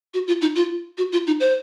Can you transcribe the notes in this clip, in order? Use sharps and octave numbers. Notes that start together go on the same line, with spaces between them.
F#4
F4
D#4
F4
F#4
F4
D#4
C5